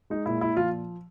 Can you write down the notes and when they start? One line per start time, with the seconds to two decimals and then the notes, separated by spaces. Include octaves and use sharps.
0.10 G#3 D#4
0.26 A#2 E4
0.41 A#2 E4
0.56 F3 F4